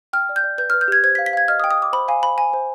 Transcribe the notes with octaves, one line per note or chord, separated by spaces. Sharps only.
G5 F6
D5
G6
D5
B4 G6
B4 F6
G6
G4 G#6
C5 G#6
B6
F5
B6
F5 G#6
D#5 F6
D#6
G5
D#6
G5 D6
C5 B5
F5 G#5
C5 B5
C5 G#5
C5